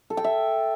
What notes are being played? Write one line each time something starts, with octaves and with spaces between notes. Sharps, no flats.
A4
G5
E5